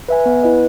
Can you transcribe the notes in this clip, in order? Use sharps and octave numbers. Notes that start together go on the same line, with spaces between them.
B4 E5 G#5
B3
E4 B4 D#5